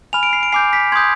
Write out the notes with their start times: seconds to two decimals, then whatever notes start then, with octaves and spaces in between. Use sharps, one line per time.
0.13 G#5 B5 F6 F7
0.23 D7
0.33 C7
0.43 D7
0.52 G#5 D6 G6 C7
0.73 B6
0.92 C6 D#6 G6 G#6